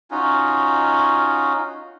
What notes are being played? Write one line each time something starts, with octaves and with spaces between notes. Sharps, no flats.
C#4 D#4 F4 F#4